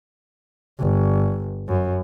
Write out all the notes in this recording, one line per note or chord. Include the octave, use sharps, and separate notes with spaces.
G1
F#2